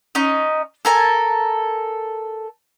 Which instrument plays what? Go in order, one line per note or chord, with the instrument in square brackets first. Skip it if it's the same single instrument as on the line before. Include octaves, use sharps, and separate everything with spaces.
[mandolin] C#4 D#4 D#5
A4 A#4 G#5 A5